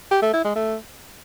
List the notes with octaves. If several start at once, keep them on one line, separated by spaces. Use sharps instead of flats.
G4
A3
E4
G#3
A3